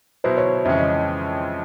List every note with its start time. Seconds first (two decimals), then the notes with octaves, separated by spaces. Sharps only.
0.24 B2 F#3 B3 E4 C5
0.37 C#5
0.65 F2 C#3 E3 G#3 C#4 E5
0.76 D#5